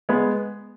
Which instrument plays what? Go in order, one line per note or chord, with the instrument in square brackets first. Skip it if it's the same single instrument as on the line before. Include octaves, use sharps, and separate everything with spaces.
[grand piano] G#3 B3